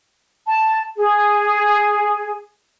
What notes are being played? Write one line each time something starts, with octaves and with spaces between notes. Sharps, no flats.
A5
G#4